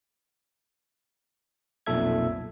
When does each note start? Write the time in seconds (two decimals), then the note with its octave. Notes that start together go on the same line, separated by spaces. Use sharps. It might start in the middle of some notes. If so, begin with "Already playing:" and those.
1.86 B1 F2 A#2 A4 E5 G#6